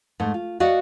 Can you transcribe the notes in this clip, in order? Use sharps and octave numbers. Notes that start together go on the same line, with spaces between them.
G#2 A3
F4
F#4 D5 D#5 F5 F#5